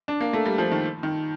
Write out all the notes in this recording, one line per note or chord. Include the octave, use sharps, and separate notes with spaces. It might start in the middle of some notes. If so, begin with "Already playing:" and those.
D4
A#3
A3
G3
F3
D#3
D#3